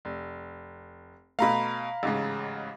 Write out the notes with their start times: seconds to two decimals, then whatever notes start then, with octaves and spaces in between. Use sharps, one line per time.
0.05 F1
1.39 B2 A3 F5 A#5 B5
2.03 A1 G#2 C#3